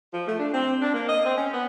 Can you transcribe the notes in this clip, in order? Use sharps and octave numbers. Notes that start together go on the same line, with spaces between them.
F3
A3
D4
C4
D4
A#3
D#5
C4
C#4
B3